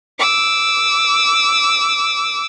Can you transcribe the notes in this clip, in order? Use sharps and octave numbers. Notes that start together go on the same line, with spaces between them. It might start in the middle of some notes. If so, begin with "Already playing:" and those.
D6 E6